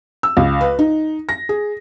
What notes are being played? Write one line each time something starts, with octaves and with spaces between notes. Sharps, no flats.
E6
C#2
B4
D#4
A#6
G#4